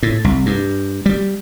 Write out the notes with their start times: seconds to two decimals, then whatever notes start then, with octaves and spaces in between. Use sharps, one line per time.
0.03 A2
0.24 C2
0.46 G2
1.06 G3